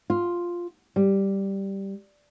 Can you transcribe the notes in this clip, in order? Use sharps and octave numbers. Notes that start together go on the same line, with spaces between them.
F4
G3